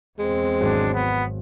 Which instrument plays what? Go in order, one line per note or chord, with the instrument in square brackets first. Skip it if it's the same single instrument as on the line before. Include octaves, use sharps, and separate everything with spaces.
[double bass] E2 C4 [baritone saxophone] G#3
[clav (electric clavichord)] G#1 F#3 [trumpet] D4
[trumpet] B3